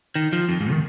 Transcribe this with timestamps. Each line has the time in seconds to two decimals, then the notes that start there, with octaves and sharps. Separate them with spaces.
0.15 D#3
0.33 F3
0.49 F2
0.61 G#2
0.71 D#3